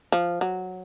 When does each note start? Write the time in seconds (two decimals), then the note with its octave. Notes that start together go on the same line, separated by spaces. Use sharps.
0.12 F3
0.41 F#3